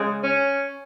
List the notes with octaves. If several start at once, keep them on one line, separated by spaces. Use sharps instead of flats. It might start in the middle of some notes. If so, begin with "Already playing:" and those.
Already playing: C#3 G#3
C#4